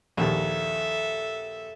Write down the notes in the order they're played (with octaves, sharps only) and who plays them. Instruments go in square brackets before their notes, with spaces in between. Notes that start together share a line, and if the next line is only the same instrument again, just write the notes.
[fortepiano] A#1 D#2 [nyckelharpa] A4 E5